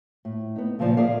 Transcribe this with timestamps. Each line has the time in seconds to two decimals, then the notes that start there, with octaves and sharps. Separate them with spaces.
0.25 A2
0.56 B3 D#4
0.79 D2 A#2 C#3 F3 C5 D5
0.97 G#4 A#4 D5 E5 F5